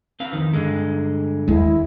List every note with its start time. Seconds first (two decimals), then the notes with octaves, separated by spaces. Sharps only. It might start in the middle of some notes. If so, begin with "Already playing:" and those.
0.20 C4 B4 F5
0.33 F2 D#3
0.54 G2 D3 G#3
1.48 D#2 G#3 E4